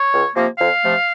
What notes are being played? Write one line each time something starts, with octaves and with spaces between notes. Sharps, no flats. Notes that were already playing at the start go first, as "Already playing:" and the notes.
Already playing: C#5
C#2
C3 F3 A#3
F2 F5
C3 F3 A3